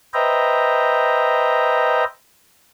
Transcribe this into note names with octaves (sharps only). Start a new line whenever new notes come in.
B4 C5 D#5 E5 G5 A#5